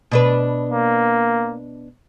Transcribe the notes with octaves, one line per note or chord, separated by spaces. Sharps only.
B2 D4 B4
A#3